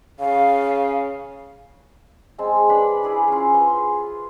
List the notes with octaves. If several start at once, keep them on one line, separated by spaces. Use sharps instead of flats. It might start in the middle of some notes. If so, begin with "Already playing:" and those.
C#3 F5
G#3 C4 A5 E6
D4 B4 D5 B5
E4 G#4 D5
C#4 F4
B4 C6